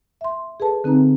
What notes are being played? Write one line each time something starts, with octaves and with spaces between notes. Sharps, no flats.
E5 C6
G#4 A4 B4 A5
D3 C4 D#4 B4 A#5